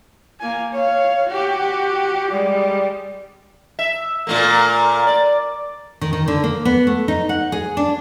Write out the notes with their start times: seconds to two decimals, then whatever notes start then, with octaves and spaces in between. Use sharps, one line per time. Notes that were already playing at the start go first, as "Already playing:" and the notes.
0.40 A#3 G#5
0.73 C#5 F5
1.28 F#4 G4
2.31 G3 G#3
3.79 E5
4.27 A#2 A3 A#3
5.07 D5
6.01 D#3
6.13 D#3
6.28 D3
6.44 A#3
6.65 B3
6.87 A3
7.08 D#4
7.29 F#5
7.52 G#4
7.77 D4